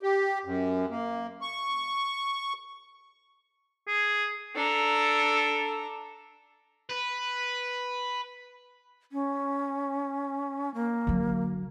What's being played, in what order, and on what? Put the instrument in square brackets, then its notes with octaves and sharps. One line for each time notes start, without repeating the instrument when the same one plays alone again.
[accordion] G4
F#2
A#3
C#6
[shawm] G#4
[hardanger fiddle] D4 A#5 [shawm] A4
[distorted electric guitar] B4
[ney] C#4
A#3
[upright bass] D3 F#3